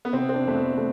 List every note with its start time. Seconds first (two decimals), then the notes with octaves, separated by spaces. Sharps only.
0.05 B3
0.13 C3 C4
0.29 C4
0.34 D4
0.45 F2 A3
0.56 B3
0.77 A3